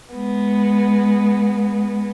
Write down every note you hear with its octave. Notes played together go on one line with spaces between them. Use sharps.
G#3 B3